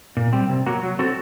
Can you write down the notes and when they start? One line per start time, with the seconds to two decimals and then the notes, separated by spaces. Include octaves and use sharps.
0.17 A#2
0.33 G3 C4
0.49 C3
0.66 F#3 A#3 F#4
0.83 F#3
0.99 C4 F#4 A4